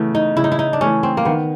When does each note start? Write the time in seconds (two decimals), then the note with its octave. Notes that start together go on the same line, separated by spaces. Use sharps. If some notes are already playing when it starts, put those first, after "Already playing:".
Already playing: C#3 E3 A3 B3
0.15 D#4
0.36 C#3 E4
0.44 D#4
0.52 E4
0.59 D#4
0.73 D4
0.81 E3 A3 C#4
1.03 C4
1.17 A#3
1.25 D#3 B3